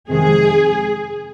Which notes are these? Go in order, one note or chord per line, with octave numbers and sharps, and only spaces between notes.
F2 C3 D#3 G#3 G#4